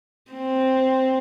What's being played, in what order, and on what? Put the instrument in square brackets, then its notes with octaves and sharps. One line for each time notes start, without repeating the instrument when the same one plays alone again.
[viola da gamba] C4